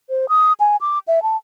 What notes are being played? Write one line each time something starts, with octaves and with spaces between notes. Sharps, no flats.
C5
D#6
G#5
D6
E5
A5